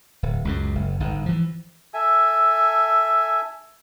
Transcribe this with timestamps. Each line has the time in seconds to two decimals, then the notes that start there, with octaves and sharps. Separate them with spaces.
0.23 D1
0.45 C#2 F#2 C#3
0.75 F#1
1.00 G1 G#2
1.26 E3 F3
1.94 A4 E5 G#5